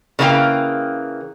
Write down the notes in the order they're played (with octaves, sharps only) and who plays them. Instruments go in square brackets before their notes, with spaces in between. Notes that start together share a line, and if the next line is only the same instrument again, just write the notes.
[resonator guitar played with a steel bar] C#3 E3 A#3 B3 F5 G5